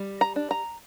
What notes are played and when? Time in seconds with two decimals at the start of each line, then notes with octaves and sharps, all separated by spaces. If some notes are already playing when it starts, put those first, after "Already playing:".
Already playing: G3
0.21 A#5
0.36 D4
0.51 A#5